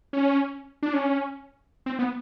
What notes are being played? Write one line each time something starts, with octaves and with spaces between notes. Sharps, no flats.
C#4
D4
C#4
C4
B3